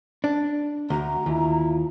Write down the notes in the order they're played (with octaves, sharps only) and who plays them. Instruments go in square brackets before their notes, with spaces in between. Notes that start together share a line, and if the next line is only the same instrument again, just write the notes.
[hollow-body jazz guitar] D4
[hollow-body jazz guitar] D2 [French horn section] F#4 [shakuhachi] A#5
[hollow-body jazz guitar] D#2 [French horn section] E4 F4